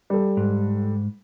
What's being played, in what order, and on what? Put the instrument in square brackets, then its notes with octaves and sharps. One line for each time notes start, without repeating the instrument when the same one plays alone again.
[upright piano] G3 A4
[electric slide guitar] G#2